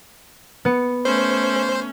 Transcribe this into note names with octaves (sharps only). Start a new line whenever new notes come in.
B3 C#7
A3 C#4 C5